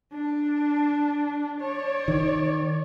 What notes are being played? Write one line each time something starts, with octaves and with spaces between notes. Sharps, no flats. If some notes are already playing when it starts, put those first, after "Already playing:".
D4
C#5 D5
D#3